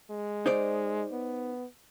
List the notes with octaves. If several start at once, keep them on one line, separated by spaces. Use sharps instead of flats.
G#3
D#4 C5 D5
B3